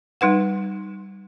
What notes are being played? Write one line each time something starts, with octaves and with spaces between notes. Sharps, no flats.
G3 D#4 B4 F#5